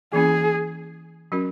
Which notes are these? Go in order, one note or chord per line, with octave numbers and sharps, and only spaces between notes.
E3 A#3 C#4 E4 G#4
F#3 C#4 F#4 A#4